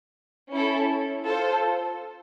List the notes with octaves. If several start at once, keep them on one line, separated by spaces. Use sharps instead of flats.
C#4 E4 A4
F4 A4 C5